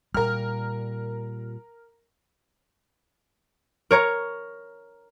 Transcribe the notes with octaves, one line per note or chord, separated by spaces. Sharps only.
A#2 G3 A#4 F6
A#4 C#5 A#5